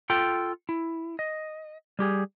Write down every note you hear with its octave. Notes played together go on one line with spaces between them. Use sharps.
F4 A4 G5
E4
D#5
G3 G4 G#4